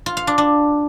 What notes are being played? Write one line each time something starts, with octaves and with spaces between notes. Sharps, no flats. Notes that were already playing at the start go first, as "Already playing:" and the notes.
F4
F5
D4
D4